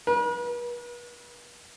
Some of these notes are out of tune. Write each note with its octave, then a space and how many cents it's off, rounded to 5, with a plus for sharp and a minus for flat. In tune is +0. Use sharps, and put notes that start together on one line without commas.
B4 -40